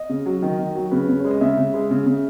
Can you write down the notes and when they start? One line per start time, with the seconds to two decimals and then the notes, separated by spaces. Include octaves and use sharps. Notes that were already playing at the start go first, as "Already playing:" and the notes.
Already playing: D#5
0.10 C#3
0.26 F#3
0.42 D#3
0.59 D#3
0.75 F#3
0.91 C#3 B4
1.09 C#3
1.20 G#3 C#5
1.31 D#5
1.41 C#3 E5
1.58 C#3
1.74 G#3
1.91 C#3
2.06 C#3